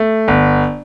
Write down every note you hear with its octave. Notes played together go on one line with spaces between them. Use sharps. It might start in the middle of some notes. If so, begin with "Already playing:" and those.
Already playing: A3
G1